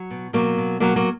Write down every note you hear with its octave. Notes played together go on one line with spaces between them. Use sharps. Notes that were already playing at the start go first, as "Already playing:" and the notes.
Already playing: F#3
B2
B2 F#3 A#3
B2
B2 F#3 A#3
F#3 A#3